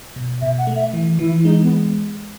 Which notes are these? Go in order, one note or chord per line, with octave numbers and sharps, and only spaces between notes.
B2
B2 E5
F#5
A3
E5
E3
E3 E4
G#3 D#4
B3